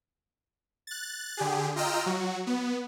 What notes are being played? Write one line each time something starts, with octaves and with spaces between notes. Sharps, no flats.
F#6 A6
D3 G4 G#4
F4 D#5 G5 A#5 E6 F6
F#3 F#4
B3